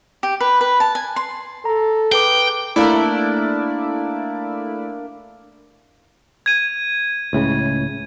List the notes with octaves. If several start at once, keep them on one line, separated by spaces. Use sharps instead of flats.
G4
B4
B4
A5
G#5
C6
A4 A#5
G#4 B4 G5 D6
A3 A#3 D4 E4 D5 A5
G#6 D#7
C#2 A2 C#3